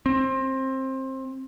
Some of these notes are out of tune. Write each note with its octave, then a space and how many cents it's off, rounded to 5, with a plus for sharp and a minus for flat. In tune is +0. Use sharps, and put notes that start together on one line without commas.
C4 +20